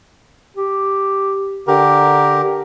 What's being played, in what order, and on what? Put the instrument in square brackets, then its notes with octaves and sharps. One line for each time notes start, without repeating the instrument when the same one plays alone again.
[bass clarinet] G4
[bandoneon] D3 G4 [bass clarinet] A#4